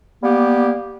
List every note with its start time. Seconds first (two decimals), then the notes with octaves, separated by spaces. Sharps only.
0.23 G3 A#3 B3 G4